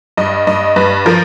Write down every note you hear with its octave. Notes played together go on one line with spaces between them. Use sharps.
G2 D#5
G2 D#5
G2 B4
F3 A#4